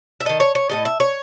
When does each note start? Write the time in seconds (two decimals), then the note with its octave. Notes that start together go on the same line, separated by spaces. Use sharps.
0.20 E5
0.25 D#3 A3 D#5
0.40 C#5
0.55 C#5
0.69 A2 F#3 A3 D#5
0.85 E5
1.00 C#5